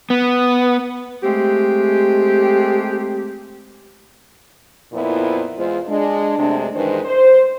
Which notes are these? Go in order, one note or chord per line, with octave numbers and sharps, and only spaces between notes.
B3
G#3 A3 C4 G4
F2 A#2 F3 B3 E4
E2 G#3 F4 C5
G#3 D4
F#2 C3 G#3 A3 D4
G2 D#3 E3 G#3 B4 C5
C5